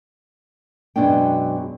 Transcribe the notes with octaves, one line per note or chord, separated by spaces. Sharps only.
F#2 B2 F#3 G#3 D4 G5